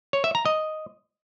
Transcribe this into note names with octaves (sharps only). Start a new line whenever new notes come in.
C#5
E5
A#5
D#5